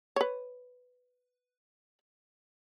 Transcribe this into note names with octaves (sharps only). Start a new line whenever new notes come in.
B4 C#5